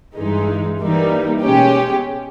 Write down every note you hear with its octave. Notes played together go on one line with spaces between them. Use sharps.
G2 E3 G#3 D#4
E3 G3 A#3 D#4
B2 G#3 C#4 G4